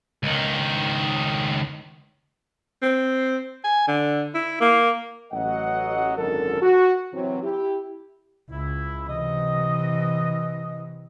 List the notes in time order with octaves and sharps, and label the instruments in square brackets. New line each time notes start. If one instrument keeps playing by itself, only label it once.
[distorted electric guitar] C#2 D#3
[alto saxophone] C4
G#5
D3
E4
A#3
[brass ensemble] A1 F#3 D#5 F#5
G#1 F#2 D3 A4 A#4
F#4
C3 E3 F#3
E4 G4
[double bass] C#2 [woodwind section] E4
[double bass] C3 E3 [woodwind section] D#5